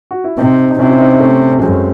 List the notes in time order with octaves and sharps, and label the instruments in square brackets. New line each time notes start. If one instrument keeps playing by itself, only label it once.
[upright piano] F#4
E4
[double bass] C3 [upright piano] C4 D#4
[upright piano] D#4
[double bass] C3 [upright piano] C#4 E4
[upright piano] E4
C4 D#4
C4
A3 C#4
C#4
[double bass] F#2 [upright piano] G#3 C4